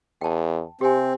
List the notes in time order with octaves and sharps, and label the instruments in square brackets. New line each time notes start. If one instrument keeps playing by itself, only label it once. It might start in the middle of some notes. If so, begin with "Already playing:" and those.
[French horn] E2 [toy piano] G5 A5
[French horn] C3 [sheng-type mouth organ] C4 [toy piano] G4 G#5